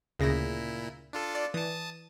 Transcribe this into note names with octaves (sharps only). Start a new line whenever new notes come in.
D2 A#2 C#3 E4 A#6
D4 F4 A4
D5
E3 A5 D#6